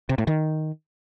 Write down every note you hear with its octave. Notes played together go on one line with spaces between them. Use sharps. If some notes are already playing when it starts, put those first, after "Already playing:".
C3
A2
D#3